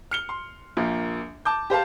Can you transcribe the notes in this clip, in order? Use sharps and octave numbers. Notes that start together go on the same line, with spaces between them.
F6 C#7 G7
C6
A#1 F3 A#3
A5 D6 G6
G4 C5 F5 A5